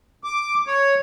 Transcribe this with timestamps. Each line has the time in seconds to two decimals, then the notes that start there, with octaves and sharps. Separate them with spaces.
0.24 D6
0.67 C#5